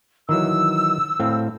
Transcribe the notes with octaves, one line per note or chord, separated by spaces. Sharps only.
D#3 E3 F#3 E6
A2 C4 F5